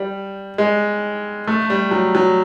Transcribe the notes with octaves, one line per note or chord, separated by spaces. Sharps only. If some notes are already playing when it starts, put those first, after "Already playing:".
Already playing: G3
G#3
A3
G3
F#3
F#3